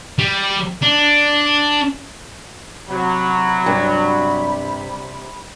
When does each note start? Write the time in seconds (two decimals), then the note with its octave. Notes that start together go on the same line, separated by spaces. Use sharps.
0.19 G3
0.82 D4
2.89 C3 F#3 B5
3.66 G2